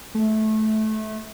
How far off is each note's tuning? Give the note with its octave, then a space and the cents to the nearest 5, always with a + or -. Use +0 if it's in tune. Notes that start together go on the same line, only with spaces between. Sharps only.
A3 -20